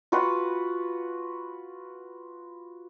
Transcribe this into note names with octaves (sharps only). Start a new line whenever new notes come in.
F4 F#4 B4 F#5